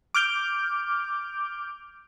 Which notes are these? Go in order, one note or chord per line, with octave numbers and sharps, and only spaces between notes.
D6 F6 G6 D7